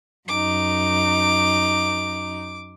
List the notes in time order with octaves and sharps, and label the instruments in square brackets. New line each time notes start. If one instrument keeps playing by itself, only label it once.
[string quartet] F#2 D#4 [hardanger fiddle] D6